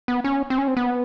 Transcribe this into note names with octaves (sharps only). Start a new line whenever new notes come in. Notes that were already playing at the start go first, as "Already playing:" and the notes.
B3
C#4
C4
C#4
C4
B3